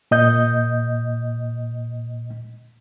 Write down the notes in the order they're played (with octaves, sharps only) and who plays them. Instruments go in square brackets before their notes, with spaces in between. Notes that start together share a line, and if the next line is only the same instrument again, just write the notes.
[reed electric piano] A#2 D#5 G6